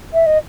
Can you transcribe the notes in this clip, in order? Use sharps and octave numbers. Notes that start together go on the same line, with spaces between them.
E5
D#5